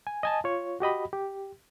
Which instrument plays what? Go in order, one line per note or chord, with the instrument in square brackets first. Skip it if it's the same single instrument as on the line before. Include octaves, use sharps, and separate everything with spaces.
[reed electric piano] G#5
D#5 G#5 A5
F4 C#5
F#4 G4 D#5 B5
G4